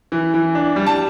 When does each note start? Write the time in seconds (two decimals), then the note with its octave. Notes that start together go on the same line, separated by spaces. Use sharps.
0.12 E3
0.34 E3
0.55 D4
0.76 G3
0.87 A5